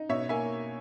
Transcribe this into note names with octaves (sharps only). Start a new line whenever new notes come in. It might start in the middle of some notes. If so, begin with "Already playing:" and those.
Already playing: D#4
B2 C#5 E5
A#3 E5 G#5